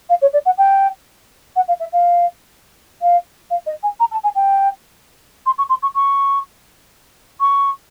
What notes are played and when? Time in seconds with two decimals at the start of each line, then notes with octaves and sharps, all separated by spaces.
0.09 F5
0.21 C#5
0.33 D5
0.45 F#5
0.57 G5
1.55 F#5
1.67 F5
1.79 E5
1.92 F5
3.01 F5
3.50 F5
3.66 D#5
3.82 G#5
3.99 A#5
4.11 A5
4.23 G#5
4.35 G5
5.45 C6
5.58 C#6
5.69 C6
5.82 C#6
5.94 C#6
7.40 C#6